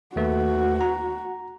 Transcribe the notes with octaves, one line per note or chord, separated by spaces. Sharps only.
D#2 A3 F#4 B4
A#5